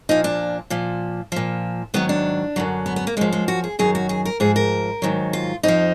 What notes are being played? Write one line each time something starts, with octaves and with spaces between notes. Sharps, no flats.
A#2 F3 D#4
D4
A#2 F3
A#2 F3
G#2 D#3 F#3 B3
D4
F#2 D3 F#3
B3
B3
A#3
F#2 F3 G#3
G#3
F#4
G#4
F#2 D#3 F#3 G#4
F#4
G#4
A#4
G#2 F3 G#4
A#4
G#2 D#3 F#3
F4
F2 F3 D#4